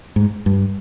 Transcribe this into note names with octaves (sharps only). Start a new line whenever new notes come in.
G#2
G2